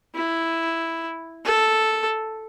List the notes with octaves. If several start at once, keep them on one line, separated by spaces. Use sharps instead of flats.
E4
A4